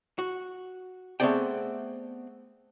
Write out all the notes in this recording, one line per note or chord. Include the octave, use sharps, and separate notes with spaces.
F#4
A3 B3 C4 G#4 D5 G5